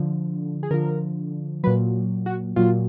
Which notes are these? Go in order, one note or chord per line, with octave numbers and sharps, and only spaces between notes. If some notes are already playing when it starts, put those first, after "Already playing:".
Already playing: D3 F3
G#4
D3 F3 A#4
A#2 F#3 B4
F#4
A#2 F#3 F4